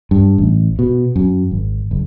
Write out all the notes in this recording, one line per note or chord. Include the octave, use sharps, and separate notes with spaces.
G2
A1
B2
F#2
G#1
F#1